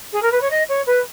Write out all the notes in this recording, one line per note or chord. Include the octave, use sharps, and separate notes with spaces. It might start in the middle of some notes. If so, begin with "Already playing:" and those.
G#4
A#4
B4
C#5
D#5
C#5
B4